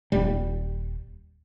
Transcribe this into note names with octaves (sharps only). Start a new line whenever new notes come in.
D#1 G3